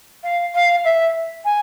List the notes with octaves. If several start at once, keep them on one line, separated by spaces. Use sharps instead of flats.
F5
F5
E5
G#5